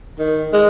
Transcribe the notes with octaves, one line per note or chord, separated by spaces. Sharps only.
D#3
G#3